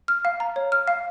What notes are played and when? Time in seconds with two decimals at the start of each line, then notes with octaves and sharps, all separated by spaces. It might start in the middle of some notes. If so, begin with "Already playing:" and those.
0.08 F6
0.25 F5
0.40 A#5
0.56 C#5
0.72 F6
0.88 F5